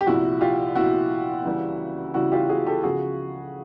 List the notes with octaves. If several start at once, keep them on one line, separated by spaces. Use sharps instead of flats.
G4
C2 A#2 F3 E4 F#4
F4 G4
C2 A#2 F3 E4 F#4
C#2 C#3 E3 G3
C#2 C#3 E3 G3 E4 F#4
F4 G4
F#4 G#4
G4 A4
C#2 C#3 F3 F#4 G#4